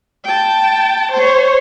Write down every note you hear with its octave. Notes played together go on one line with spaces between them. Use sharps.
G5 A5
C5 C#5